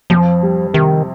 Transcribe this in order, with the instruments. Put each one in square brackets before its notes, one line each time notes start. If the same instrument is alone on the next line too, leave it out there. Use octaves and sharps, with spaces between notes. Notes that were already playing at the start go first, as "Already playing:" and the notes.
[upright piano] F2 [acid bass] F3
[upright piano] G3
[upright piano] C3 [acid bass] D#3